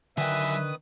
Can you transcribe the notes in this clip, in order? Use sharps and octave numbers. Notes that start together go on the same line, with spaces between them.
D3 D#3 F#3 B4 E5 G5 G#5 D#6